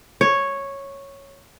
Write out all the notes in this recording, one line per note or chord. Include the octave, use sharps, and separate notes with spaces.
C#5